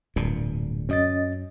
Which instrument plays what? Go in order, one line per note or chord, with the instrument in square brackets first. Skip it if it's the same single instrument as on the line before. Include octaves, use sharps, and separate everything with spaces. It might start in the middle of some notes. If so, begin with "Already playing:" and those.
[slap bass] D1 G2 A#2
[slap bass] F#2 [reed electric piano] C#4 D#5 A6